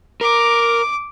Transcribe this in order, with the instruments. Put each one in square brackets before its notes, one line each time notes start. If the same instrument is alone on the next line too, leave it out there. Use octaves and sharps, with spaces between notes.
[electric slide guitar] A#4 [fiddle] D6